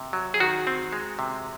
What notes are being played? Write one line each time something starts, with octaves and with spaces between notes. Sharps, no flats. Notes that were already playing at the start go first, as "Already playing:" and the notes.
Already playing: C3
F#3
G#4
D#3 F#4
C4
G#3
C3